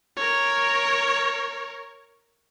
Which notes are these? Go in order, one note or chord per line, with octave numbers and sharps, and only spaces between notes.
A#4 C#5